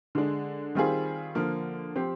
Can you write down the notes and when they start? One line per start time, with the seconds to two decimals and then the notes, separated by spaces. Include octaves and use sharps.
0.15 D3 G#3 D4
0.75 D#3 G3 C4 F4 G#4
1.35 D3 F3 A#3
1.96 F3 C4 G4 C5